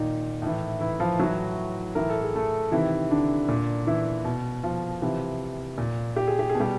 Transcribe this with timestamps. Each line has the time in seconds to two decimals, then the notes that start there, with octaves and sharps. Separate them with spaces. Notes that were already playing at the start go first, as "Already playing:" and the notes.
Already playing: A#2 D#3 D#4
0.42 A2 E3
0.80 E3 E4
1.00 F3 F4
1.19 A2 E3 F#3 F#4
1.95 A2 E3 A#4
2.10 A4
2.23 G#4
2.36 A3 A4
2.72 C3 D#3 E3 E4
3.11 D3 D4
3.48 A#2
3.87 E3 E4
4.25 B2
4.63 F3 F4
5.02 C3 E3
5.78 A#2
6.16 G4
6.28 G#4
6.39 G4
6.50 G#4
6.55 B2
6.60 G3 G4